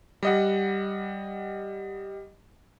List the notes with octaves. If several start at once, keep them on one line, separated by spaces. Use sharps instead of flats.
G3 D#5 F#5